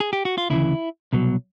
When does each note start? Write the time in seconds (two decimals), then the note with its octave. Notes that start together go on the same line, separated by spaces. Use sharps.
0.00 G#4
0.13 G4
0.25 F#4
0.38 F4
0.50 D2 C#3 E3 E4
1.13 C2 B2 F#3